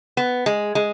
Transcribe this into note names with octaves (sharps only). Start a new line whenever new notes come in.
B3
G#3
G#3